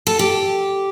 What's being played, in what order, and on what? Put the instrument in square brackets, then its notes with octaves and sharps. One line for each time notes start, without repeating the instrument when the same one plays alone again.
[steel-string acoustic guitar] A4
G4